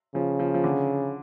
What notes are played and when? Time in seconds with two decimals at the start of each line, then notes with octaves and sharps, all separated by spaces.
0.15 C#3 F3
0.39 F3
0.54 F3
0.64 D3